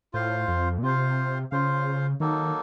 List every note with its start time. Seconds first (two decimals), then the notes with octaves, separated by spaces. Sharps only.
0.13 A2 F4 C5 F5
0.48 F2
0.78 A#2
0.83 C3 F4 C5 F5
1.51 C#3 F4 C5 F5
2.20 D#3 F#3 A#3 D#4 A4